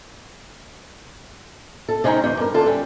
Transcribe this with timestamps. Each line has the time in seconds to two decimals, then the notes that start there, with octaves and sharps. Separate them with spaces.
1.89 A4
2.04 C3 G#3 C4 C#4 D#4 A#5
2.24 E2 D#4
2.37 G2 A#4
2.54 D3 F4 A4
2.66 G3 C#4